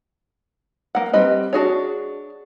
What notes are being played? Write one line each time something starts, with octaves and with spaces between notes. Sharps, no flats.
A#3 F#5
G3 C4 B4 D#5
D4 F#4 G#4 C#5